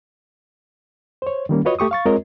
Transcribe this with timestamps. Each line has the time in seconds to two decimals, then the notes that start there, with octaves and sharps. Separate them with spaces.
1.22 C5 C#5
1.49 D#3 G3 A#3 C#4
1.65 F4 F#4 B4 C#5 D#5
1.79 A3 G4 C#6 D#6
1.91 F5 C#6 A6
2.05 G#3 C4 F4 A#4 C#5 D#5